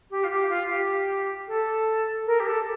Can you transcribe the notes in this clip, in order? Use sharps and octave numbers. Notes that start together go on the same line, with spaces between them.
G4
F4
G4
F4
G4
A4
A#4
G4
A4